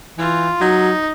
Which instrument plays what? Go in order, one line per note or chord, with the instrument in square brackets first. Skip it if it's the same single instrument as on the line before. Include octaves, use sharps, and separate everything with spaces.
[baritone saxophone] E3 [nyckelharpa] F4
[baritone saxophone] F#3 [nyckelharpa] D#4